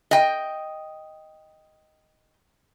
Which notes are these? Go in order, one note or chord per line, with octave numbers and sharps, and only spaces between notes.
D#5 G5